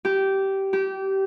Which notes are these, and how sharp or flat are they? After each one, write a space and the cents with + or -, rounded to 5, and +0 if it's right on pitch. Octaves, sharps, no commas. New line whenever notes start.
G4 -15
G4 -25